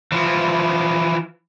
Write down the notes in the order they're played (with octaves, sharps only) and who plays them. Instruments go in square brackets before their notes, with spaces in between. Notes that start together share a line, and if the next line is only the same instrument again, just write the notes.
[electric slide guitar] E3 F3